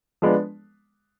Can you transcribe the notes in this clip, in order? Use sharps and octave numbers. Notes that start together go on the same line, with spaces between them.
F3 G#3 B3 D4